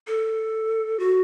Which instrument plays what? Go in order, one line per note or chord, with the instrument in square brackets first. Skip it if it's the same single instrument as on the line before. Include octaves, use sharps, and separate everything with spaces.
[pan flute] A4
F#4